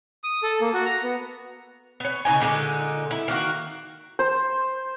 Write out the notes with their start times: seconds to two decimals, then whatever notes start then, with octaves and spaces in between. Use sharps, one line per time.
0.24 D#6
0.43 A4
0.61 A#3
0.74 F#4
0.85 A#5
1.03 B3
2.00 B3 C#5
2.25 C#3 D#4 D#5 G#5
2.40 A#2 D3 G#3 D#4
3.11 E4
3.28 D#3 A#3 F#4
4.19 C5